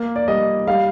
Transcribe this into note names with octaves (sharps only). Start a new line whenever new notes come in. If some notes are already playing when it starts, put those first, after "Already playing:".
Already playing: A#3
D5
G3 D#5
G3 F5